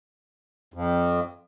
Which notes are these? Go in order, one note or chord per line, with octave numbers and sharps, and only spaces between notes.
F2